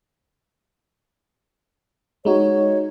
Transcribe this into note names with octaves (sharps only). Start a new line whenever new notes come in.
G#3 D#4 F#4 C#5